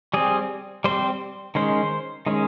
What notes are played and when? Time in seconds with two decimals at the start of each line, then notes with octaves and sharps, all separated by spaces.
0.14 G3 C4 G#4
0.84 G3 C4 C5
1.55 D#3 G#3 C#4 C5
2.26 D#3 G#3 C#4